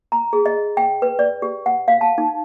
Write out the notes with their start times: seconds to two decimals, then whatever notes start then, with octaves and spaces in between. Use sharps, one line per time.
0.12 A#5
0.33 G#4
0.46 D#5
0.77 G5
1.02 B4
1.19 D5
1.42 G4
1.66 F#5
1.88 F5
2.01 A5
2.18 D#4